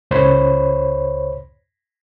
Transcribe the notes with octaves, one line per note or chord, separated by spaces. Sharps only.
C#2 C5 C#5 B5